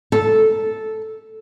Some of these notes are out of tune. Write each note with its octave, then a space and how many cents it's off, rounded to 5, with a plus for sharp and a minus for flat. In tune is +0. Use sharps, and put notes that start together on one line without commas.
A4 -5